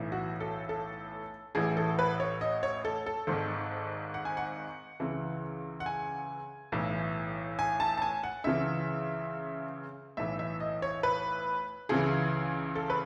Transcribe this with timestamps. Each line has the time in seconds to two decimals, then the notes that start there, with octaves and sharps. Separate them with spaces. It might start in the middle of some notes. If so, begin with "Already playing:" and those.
Already playing: B1 A2 E3
0.12 F#4
0.40 A4
0.69 A4
1.55 A1 A2 E3 G#4
1.77 A4
1.99 B4
2.20 C#5
2.41 D#5
2.63 C#5
2.85 A4
3.06 A4
3.27 G#1 G#2 D#3 A4
4.14 F#5
4.25 G#5
4.37 F#5
5.00 C#2 C#3 E3
5.80 F#5
5.86 G#5
6.72 B1 A2 E3
7.59 G#5
7.80 A5
7.98 A5
8.02 G#5
8.23 F#5
8.44 C#2 C#3 E3 E5
10.17 B1 A2 E3 E5
10.39 E5
10.60 D#5
10.82 C#5
11.03 B4
11.89 C#2 C#3 E3 G#4
12.75 A4
12.90 B4